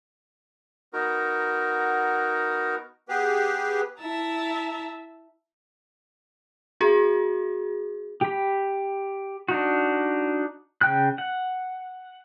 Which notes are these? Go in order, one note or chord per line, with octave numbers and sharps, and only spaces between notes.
B3 D#4 F#4 A#4
B3 G4 G#4 B4
E4 E5 A5 A#5
C4 F#4 G#4
G4 B5
D4 D#4 F#4
C#3 G5 F#6
F#5